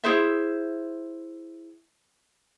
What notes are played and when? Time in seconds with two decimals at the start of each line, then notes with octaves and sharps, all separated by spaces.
0.04 E4 G#4 C5 E5